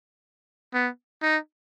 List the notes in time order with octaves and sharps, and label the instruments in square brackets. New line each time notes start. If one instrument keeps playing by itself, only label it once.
[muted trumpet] B3
D#4